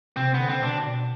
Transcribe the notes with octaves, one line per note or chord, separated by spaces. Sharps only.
C3 C4
C3 B3
D3
C4
B2 D4